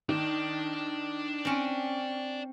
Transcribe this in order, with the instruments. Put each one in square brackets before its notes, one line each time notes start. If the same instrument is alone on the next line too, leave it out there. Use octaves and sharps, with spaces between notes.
[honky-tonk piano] D#3 [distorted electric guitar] D4
[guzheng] C4 C#4